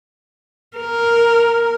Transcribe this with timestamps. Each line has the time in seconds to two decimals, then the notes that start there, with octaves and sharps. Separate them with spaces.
0.77 A#4